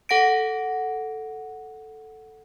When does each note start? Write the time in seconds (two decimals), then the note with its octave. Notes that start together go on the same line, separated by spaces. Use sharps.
0.09 A4 F#5 A#6 D7